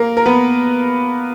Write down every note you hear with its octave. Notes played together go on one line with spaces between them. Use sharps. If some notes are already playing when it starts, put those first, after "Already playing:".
Already playing: A#3 A#4
A#4
B3 B4